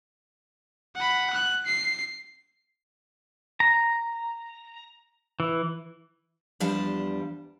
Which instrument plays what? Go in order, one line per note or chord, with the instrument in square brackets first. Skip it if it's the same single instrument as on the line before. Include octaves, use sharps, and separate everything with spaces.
[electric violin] F#5 B5
F#6
C7
[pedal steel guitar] A#5
E3
[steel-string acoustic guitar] E2 F3 G3 D4 F5 A5